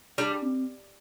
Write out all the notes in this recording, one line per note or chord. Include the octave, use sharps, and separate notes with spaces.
G3 D4
C4